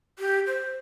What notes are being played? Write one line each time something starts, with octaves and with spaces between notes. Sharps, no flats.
G4
C5